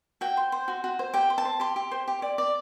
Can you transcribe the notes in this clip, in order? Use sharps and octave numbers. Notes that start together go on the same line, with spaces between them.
F#4 G5
C5
C5
F#4
F#4
C5
G4 G5
C5
A5
C5
G4 C6
G4
C5
G4
D5
D5